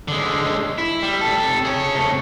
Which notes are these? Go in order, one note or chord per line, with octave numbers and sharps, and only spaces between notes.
D3 G#3
E4
G3
C3 A4
G#4 C#5
C3 A3